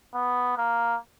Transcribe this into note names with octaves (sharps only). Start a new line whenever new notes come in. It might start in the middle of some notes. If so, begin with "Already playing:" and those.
B3
A#3